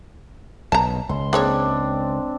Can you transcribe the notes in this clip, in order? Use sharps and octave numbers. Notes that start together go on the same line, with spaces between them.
B1 B2 A5 A#5
C#2 C6
G#3 A#3 C4 D4 C#5